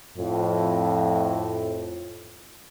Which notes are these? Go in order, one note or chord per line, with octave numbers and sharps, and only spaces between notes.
F2 A2